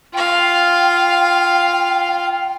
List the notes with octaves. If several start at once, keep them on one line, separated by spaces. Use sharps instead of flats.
F4 F5 G5